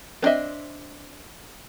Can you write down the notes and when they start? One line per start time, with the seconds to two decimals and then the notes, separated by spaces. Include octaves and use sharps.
0.22 B3 C4 D4 D#5 E5